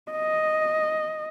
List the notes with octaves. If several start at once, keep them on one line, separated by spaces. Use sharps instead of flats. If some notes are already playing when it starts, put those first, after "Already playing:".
D#5